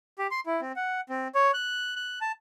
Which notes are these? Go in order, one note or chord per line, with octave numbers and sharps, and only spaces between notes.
G4
C6
E4
C4
F#5
C4
C#5
F#6
F#6
A5